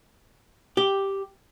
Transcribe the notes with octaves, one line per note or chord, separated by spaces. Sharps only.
G4